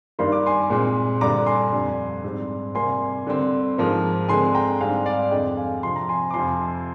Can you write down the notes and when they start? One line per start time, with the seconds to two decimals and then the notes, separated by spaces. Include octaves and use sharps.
0.19 G2 D#3 G3 A#3 C6
0.32 D6
0.46 G#5 C6
0.70 A#2 G#3 C4
1.21 G2 D3 G3 A#5 D6
1.46 G#5 C6
1.72 F2 D3 G3
2.24 G#2 G3 C4
2.75 C3 G3 A#3 G#5 C6
3.27 D3 G3 C4
3.78 G#2 F3 A#3
4.28 D3 G#3 C4 G#5 C6
4.54 G5 A#5
4.80 G#2 G3 C4 F5 G#5
5.06 D5 F5
5.31 F2 D3 G#3 C4 D#5 G5
5.57 F5 G#5
5.83 C3 F3 C4 C6
5.96 A#5
6.09 G#5 C6
6.30 D6
6.34 F2 C3 F3 G#5 C6